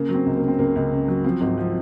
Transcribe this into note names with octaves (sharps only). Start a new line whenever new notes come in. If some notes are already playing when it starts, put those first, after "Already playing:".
Already playing: C#3 A#3
F#3
C4
C#2
C#3 A#3
C4
C#2 A#3
C#2
C#3
F#3
F3 C4
G#1
F3